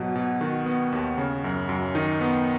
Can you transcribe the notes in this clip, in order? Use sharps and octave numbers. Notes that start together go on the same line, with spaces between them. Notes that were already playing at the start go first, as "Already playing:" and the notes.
Already playing: G#2 B2 F#3
B2
D#3 F#4
B3
D#2
C#3
F#2
F#2
D#3 D#4
B3